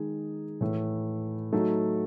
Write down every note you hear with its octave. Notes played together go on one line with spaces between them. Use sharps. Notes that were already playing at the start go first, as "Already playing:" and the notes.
Already playing: D#3 G#3 D#4 G#4
A2 E3 A3
F#3 A3 D#4 A4